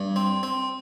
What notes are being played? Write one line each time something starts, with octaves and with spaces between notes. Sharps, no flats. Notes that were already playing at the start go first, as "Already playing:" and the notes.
Already playing: G2
C4
C4